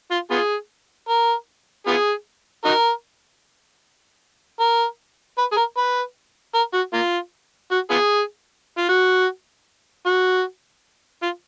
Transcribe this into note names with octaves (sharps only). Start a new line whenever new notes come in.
F4
B3 F4 G#4
A#4
B3 F4 G#4
D#4 F#4 A#4
A#4
B4
G#4
A#4
B4
A#4
F#4
A#3 F4
F#4
B3 F4 G#4
F4
F#4
F#4
F4